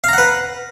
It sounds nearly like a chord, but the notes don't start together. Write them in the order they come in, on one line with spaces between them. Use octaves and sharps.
F5 A#5 F#5 B4